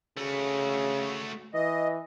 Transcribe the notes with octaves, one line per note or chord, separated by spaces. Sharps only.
C#3 A3 F#4
E3 D#5